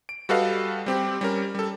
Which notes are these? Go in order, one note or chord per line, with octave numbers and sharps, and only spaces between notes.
D7
G3 F#4 A4 B4 D#5 F5
G3 C4 G4
G3 C#4 A#4
G3 A4